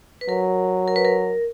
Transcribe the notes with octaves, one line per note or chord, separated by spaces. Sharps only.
B4
F#3 A#4
A#4
B4
A#4